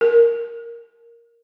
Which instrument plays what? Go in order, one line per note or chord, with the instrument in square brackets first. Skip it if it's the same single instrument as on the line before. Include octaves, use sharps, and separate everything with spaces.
[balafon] A#4